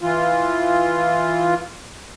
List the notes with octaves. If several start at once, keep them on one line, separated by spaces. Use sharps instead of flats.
E3 F4